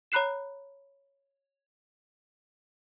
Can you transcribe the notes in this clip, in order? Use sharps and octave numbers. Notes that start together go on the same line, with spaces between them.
C#5 A#5 B5 F#6 C7 E7